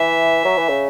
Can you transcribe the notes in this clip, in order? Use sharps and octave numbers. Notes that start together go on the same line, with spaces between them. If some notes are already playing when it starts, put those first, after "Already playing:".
Already playing: E3 E5
F#3
E3
C#3